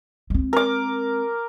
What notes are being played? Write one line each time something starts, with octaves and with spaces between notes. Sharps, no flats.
G#3 C4
A#4 D6